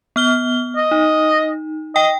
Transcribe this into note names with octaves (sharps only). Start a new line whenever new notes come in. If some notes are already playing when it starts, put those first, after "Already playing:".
B3 F6 G7
D#5
D#4
D#5 G5